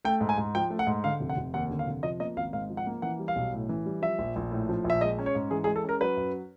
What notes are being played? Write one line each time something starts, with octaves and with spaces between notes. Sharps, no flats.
A3 G5
G#2
G#5
G#2
F3 G5
A3
F#5
G#2
D3 F5
F1
F#5
F1
D#2 F#5
D3
F5
F1
F3 D#5
A#3 D#5
G#1 F5
G#2 F5
F3
F#5
A#3
E3 F#5
G3
F5
B1
A2
E3
G3
F3 E5
A#1
A#1
A2
F3
A#1
E5
G#3 D#5
C#4
C#5
G#2
E3 G#4
G#4
G#3
A4
C#4 A#4
F#3 B4
F#2